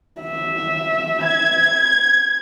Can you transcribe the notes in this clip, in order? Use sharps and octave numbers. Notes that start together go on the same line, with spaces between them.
E5
G#6